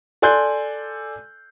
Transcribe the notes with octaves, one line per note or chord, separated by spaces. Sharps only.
A4 D5 G#5 C6 F#6 G6